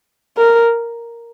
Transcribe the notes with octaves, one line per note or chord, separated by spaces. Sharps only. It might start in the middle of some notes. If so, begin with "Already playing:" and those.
A#4